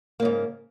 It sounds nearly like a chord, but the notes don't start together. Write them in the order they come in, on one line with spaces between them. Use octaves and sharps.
A#3 C#3 G#2